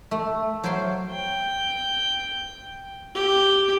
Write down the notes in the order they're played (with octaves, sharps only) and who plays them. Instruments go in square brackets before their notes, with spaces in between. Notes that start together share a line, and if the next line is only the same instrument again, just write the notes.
[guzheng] A3
F#3 C5 F5 G5 C6
[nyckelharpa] G5
G4